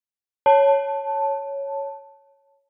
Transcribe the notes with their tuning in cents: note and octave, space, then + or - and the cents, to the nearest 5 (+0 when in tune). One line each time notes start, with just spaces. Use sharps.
C#5 +0 A5 +0